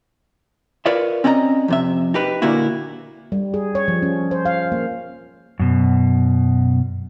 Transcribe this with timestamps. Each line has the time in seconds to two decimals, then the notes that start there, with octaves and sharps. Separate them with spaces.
0.86 F4 A#4 B4 C#5 D5 E5
1.24 C4 C#4 D5 D#5 F#5 A#5
1.68 F2 C3 E5
2.14 D#4 G4 B4
2.42 A#2 D3 A#3 D4 E4 F#4
3.32 G3
3.54 G#4
3.75 C#5
3.88 F3
4.02 C#4
4.31 C5
4.45 F5
4.72 A#3
5.59 F#2 B2